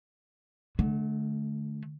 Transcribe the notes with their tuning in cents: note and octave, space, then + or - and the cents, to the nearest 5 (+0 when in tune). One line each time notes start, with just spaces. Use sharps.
D3 +0 A3 -30